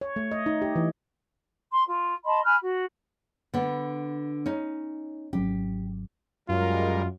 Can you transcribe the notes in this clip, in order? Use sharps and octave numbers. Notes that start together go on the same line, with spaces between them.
C#5
A3
D#5
D#4
G4
E3
C6
F4
D#5 A5 B5 C6
G#5 B5 F6 F#6
F#4
D3 B3
C#4 D#4
G#1 F#3 C#4 G4
F#2 G3 G#3 F4 A#4